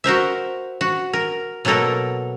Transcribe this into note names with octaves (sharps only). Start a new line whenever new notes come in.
F#4 A#4 C5 E5
F#4
A#4
B2 F#3 A#3 A4 A#4